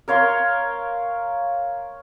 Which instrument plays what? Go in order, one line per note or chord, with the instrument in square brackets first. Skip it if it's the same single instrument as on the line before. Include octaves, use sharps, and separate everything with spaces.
[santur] A#4 C#5 F5 C6